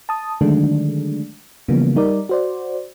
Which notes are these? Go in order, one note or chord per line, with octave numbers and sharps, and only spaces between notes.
A5 D#6
D3 D#3 F#3 G#3 A3 D4
C#3 E3 F3 G3 A#3 B3
G3 D#4 A#4 D5
F#4 C5 D5